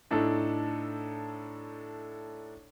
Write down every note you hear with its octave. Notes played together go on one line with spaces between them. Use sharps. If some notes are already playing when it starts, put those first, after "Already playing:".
A2 D4 D#4 A4